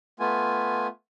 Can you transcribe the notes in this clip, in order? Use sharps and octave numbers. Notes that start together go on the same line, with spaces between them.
A3 B3 F4 G#5